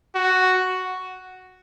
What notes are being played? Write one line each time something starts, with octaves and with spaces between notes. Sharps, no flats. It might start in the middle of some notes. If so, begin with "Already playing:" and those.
F#4